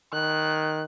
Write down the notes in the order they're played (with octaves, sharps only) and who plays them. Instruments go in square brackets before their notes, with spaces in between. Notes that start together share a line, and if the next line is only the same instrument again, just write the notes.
[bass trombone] D#3 [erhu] F#6